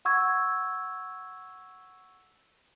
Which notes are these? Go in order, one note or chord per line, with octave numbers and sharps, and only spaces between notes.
F#5 C#6 E6 G#6